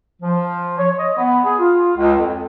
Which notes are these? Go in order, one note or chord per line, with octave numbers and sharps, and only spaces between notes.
F3
C#5
D#5
B3
G#4
F4
C#2
F2